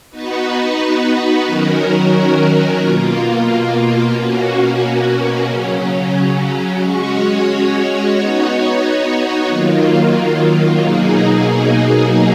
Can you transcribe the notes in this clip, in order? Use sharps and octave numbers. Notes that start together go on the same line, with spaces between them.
B3 D#4 F#4 B4
D#3 F#3 C#4 F#4 A#4
B2 A#3 F4
B2 A#3 C#4 F#4
C#3 F#3 C#4
G#3 C#4 F#4 C#5
B3 D#4 F#4 C#5
D#3 F#3 A#3 F4
B2 F#3 A#3 D#4 G#4